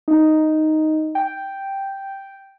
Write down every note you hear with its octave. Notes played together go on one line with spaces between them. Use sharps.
D#4
G5